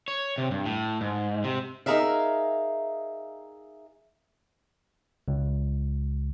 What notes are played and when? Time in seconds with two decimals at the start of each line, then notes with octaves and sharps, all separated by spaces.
0.08 C#5
0.38 C3
0.51 G2
0.66 A2
1.01 G#2
1.44 C3
1.86 D#4 E4 G#4 A#4 E5 F5
5.28 C#2